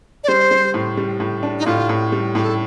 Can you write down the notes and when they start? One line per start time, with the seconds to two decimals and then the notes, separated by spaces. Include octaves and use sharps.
0.24 D5
0.28 G3 C5
0.51 G3
0.74 A2
0.97 G3
1.20 A2
1.43 D4
1.59 D#4
1.66 A2 F4
1.89 A2
2.12 G3
2.35 A2 G4
2.44 A4